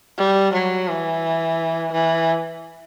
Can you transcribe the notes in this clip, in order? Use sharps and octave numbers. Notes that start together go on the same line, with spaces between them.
G3
F#3
E3
E3